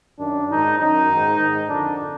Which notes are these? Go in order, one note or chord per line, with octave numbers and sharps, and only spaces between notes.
F#2 D#3 D4
G#2 D#3 D#4
F#2 D#3 D#4
G#2 D#3
G#2 D#3
F2 D3 D4